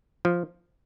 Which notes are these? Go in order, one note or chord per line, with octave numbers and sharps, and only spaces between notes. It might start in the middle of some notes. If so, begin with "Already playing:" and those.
F3